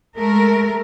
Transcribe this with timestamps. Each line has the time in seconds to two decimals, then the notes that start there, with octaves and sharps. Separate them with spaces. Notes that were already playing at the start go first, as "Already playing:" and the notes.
0.17 G#3 A3 A#4